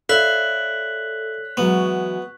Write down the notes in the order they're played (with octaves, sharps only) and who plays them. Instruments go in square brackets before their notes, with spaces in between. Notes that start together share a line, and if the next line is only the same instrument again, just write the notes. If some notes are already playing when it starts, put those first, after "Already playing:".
[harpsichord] E4 [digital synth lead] A4 [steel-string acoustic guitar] C#5 D5 F5 [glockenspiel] F#6 B6 F#7
[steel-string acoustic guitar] E3 F#3 G#3 [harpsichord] B3 [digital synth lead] C#6